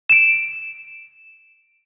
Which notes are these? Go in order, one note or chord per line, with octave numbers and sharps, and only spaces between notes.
D7 E7